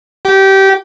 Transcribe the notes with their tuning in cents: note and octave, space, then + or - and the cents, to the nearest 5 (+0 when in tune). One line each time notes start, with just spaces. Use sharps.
G4 -20